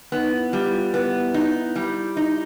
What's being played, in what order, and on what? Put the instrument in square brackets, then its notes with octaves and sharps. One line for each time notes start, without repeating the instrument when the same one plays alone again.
[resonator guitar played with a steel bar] B3 [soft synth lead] D#4
[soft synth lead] E4
[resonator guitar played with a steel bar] G3 [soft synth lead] F4
[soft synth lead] E4
F4
[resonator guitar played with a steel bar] B3 [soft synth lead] E4
[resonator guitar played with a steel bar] D#4
G3
D#4